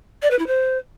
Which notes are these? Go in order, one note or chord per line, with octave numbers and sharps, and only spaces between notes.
D5
B4
E4
C5